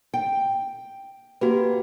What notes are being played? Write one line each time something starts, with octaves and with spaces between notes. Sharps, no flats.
G5
A#3 F#4 G4 B4